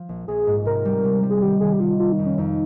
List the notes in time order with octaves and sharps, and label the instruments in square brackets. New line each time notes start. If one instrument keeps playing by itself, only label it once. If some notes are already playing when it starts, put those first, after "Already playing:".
Already playing: [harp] F3
A#1
[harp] A#1 [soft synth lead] G#4
[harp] G#2
[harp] C3 [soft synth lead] A#4
[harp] G3
C3
G3
[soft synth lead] G#4
[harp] D#3 [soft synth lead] G4
[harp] D#3 [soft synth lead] G#4
[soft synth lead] G4
[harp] D#3 [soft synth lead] F4
[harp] A#3 [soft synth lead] F4
[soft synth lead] D#4
[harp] F2
[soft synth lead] C#4
[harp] F2 [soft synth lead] D#4